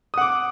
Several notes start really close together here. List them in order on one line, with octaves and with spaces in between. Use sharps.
D#6 F#5 D6